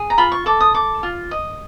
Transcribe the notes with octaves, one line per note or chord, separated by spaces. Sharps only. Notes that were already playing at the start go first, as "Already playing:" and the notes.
Already playing: G#4
A#5
F4 B5
C#6
A4 D6
D#6
A4 D6
F4
D#5